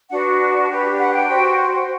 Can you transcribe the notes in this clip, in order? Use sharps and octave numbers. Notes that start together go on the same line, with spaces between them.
D4 F#4 B4 F#5
D4 G4 B4
F#5
G5
F#4 C5